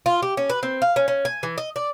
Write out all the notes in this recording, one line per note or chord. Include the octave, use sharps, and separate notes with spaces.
F4
G4
C#4
B4
C4
F5
C#4
C#4
G#5
E3
D#5
D5